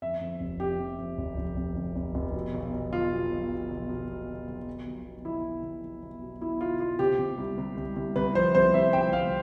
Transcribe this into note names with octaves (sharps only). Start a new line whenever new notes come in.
F2 E5
F2
F1
F2 G4
F2
F2
F1
F1
F1
F1
F1
F1
B2
B1
B1
B1 F4
B2
B1
B2
B1
B2
B2
B1
B1
B1
B1
B2
B1 E4
B1
B1
B1
B1
B2
B2 E4
B2 F4
B2 F4
C3 G4
C3
C2
C2
C2
C2
C2 B4
F3 C5
C2 C5
C2 E5
C2 G5
C2 F5